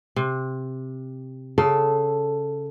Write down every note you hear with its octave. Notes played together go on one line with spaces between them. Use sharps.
C3
C#3 A4